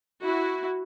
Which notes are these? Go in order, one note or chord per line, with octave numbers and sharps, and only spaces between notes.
E4 F#4